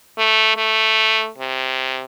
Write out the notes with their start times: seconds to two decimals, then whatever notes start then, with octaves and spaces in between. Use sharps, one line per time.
0.18 A3
0.57 A3
1.38 C3